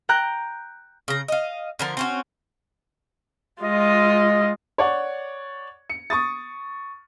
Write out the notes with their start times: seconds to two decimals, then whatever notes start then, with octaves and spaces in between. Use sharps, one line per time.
0.09 G5 A#5 F#6 G6
1.08 C#3 A#5
1.28 D#5 F5
1.79 D3 F3 A#4
1.97 C4 C#4 F#4
3.62 G#3 F4 D#5
4.78 C#5 D5 F#5 C#6
5.90 C#7
6.10 C#6 D#6 A6